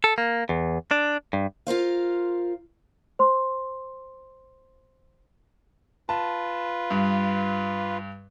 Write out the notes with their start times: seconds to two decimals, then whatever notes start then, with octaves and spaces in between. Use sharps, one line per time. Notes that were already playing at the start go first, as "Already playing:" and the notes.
0.04 A4
0.18 A#3
0.49 E2
0.91 D4
1.33 G2
1.67 F4 A#4 C5 F5
3.19 C5 C6
6.09 F4 B4 A5
6.91 G2